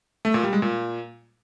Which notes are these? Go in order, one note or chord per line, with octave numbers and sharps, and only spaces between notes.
A3
A#2
G3
G#3
A#2